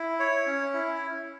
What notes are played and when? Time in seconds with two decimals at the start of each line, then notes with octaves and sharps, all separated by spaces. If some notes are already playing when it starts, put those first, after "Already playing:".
Already playing: E4
0.20 C#5
0.47 C#4
0.74 E4